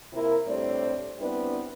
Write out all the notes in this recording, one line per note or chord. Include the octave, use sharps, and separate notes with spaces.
C3 A#3 E4 A#4
A2 G3 A3 C4 D4 D5
G3 B3 C4 D4 E4 B4